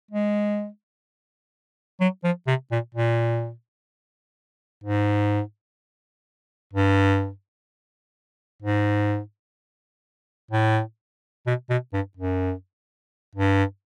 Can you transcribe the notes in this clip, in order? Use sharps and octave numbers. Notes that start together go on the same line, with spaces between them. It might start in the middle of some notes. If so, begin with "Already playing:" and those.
G#3
F#3
F3
C3
A#2
A#2
G#2
G2
G#2
A2
B2
B2
G2
F#2
G2